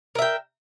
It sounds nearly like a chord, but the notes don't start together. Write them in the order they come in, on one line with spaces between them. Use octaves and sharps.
A#4 E5 G5